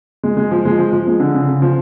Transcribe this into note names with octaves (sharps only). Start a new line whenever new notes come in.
G#3
G#3
F3
G#3
F3
F3
G#3
D3
C#3
C#3
F3